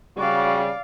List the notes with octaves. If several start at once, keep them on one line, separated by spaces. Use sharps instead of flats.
C#3 G3 F#4 D5 F5